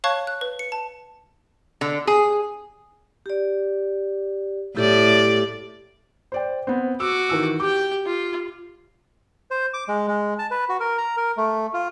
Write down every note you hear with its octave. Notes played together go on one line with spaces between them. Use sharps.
C#5 F5 A5 C#6 F#6 G#6
F#6
B4
C#7
A5
D3
G#4
G4 D5
A2 E4 G4 A4 D5
C5 D5 G5
B3 C4
F#4 D6 E6
D#3 E3 E6
G4 G5 D6
F4
C5
D6
G#3
G#3
A5
B4
F#4
A#4
A#5
A#4
A3
F4